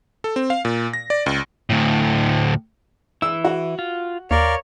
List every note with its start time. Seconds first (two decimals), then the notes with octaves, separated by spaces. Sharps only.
0.24 A4
0.36 C4
0.50 F5
0.65 A#2
0.93 A#6
1.10 D5
1.26 C#2
1.70 D2 A2
3.22 E3 E4 E6
3.44 F#4
3.79 F4
4.31 D#2 A#4 C#5 D5 F5